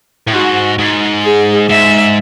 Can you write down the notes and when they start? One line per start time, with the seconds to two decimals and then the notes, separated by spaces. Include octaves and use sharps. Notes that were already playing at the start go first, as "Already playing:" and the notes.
0.27 A2
0.32 G#2 F#4
0.78 G#2
1.23 G#4
1.69 G#2 E5